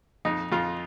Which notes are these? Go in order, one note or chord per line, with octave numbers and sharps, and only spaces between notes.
F2 D#4
F2 F4